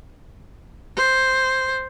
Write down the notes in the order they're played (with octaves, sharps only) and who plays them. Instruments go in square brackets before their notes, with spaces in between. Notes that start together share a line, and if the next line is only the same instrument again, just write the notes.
[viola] C5